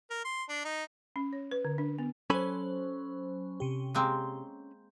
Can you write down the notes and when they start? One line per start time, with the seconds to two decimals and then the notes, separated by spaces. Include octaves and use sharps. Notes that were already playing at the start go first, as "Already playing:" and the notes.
0.10 A#4
0.25 C6
0.49 D4
0.65 D#4
1.16 C#4
1.33 C#5
1.51 B4
1.65 D3
1.78 D4
1.98 B3
2.30 F#3 C#4 A4 C5 G#5 B5
3.60 C3 G4
3.95 G#3 A#3 C4